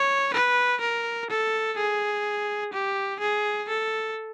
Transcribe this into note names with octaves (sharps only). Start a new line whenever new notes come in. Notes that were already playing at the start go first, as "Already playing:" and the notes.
Already playing: C#5
B4
A#4
A4
G#4
G4
G#4
A4